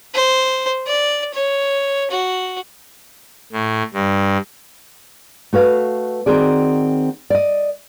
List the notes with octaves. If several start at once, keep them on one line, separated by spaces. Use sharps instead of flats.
C5
D5
C#5
F#4
A2
G2
A3 F#4 B4 F5
D#3 C4 F#4 G#4 D5
D5 D#5